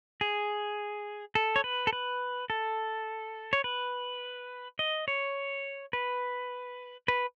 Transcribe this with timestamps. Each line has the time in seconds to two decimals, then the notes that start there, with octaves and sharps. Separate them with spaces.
0.21 G#4
1.35 A4
1.56 C#5
1.64 B4
1.87 A4
1.93 B4
2.50 A4
3.53 C#5
3.64 B4
4.79 D#5
5.08 C#5
5.93 B4
7.08 B4